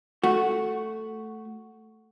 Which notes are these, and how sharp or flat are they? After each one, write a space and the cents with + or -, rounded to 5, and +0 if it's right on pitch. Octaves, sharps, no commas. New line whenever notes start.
A3 +0 F#4 +0